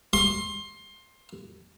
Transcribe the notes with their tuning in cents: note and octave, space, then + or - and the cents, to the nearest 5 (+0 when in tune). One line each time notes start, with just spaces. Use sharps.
C6 +20